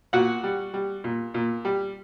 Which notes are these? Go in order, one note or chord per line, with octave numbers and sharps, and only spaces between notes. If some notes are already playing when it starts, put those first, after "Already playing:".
A#2 F#4 F#5
G3
G3
A#2
A#2
G3